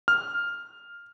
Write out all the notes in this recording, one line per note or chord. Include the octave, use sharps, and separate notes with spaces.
F6